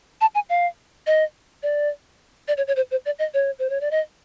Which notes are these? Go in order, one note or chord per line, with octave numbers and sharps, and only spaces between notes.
A5
G#5
F5
D#5
D5
D5
C#5
C#5
C5
C5
D5
D#5
C#5
C5
C#5
D5
D#5